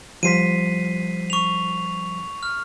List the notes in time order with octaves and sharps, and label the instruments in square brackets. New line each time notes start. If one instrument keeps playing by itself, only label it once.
[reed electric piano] F3 G3 C5 [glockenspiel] B6 C7 D#7
[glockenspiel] C#6 F7
F6